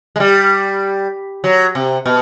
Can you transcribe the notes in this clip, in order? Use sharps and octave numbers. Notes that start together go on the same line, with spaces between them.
G#3
G3
F#3
C3
B2